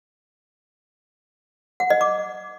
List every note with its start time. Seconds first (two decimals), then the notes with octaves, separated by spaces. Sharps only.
1.80 F#5
1.90 D#5
2.01 D6